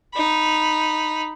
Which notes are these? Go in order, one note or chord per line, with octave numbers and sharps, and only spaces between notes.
D#4 B5